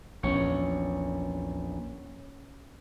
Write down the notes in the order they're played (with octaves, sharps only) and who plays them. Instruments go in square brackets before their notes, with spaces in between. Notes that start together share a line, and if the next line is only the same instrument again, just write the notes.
[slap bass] A#1 E2 [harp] C#4 C#5